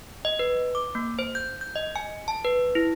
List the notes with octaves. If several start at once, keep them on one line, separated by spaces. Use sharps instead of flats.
D#5
B4
D6
A#3
C5
G6
G6
D#5
G#5
A5
B4
E4